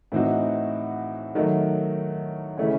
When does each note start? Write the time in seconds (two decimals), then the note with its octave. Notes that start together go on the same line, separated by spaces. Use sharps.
0.12 A2 E3 C4 D#4 F#4
1.35 D#3 F#3 A3
2.58 C#3 E3 A3 C#4